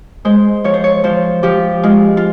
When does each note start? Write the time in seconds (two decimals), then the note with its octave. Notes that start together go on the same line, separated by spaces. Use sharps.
0.25 G#3 C5
0.64 F3 C#5
0.74 C5
0.84 C#5
1.04 F3 C5
1.43 F3 G4
1.83 G#3 F4
2.17 F4